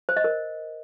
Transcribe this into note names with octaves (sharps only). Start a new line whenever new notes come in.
C5
D#5
A#4